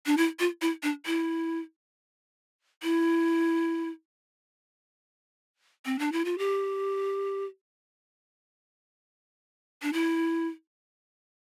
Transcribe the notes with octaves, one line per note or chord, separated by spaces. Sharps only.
D4
E4
F4
E4
D4
E4
E4
C4
D4
E4
F4
G4
D4
E4